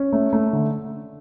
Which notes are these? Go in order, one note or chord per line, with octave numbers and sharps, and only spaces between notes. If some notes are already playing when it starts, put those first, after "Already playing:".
Already playing: C#4
A3
A3
D3